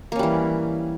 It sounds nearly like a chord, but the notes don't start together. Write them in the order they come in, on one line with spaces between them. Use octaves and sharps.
A#3 C#4 G3 E3